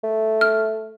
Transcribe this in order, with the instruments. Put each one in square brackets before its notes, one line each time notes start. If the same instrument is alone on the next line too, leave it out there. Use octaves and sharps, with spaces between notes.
[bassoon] A3
[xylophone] F6